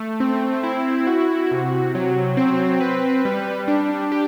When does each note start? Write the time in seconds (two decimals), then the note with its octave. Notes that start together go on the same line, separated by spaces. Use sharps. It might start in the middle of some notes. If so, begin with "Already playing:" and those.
Already playing: A3
0.20 C4
0.63 E4
1.07 F#4
1.51 C3
1.95 F#3
2.37 C4
2.81 B4
3.25 G3
3.68 D4
4.12 G4